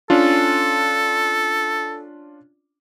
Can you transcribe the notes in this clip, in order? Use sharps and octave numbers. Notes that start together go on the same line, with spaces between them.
C#4 D4 F4 A4